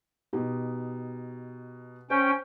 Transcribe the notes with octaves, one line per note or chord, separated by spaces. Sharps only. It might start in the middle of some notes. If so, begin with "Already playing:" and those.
B2 D#4 G4
C#4 C5 G5